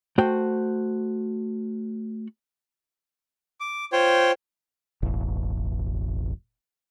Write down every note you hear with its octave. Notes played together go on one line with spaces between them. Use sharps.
A3 F#4 C5 G5
D6
F4 C5 C#5 G5
E1 A1